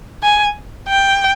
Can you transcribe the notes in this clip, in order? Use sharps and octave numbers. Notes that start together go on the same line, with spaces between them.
G#5
G5